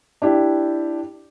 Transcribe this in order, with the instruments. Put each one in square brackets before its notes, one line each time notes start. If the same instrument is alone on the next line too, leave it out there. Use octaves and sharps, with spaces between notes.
[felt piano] D4 E4 G4